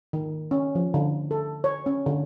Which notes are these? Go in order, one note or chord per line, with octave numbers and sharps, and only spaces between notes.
D#3
C#4
F3
D3
A4
C#5
C#4
D3